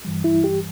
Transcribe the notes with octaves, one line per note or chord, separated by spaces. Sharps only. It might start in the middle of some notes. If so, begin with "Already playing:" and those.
G2 E3 G3
E4
G4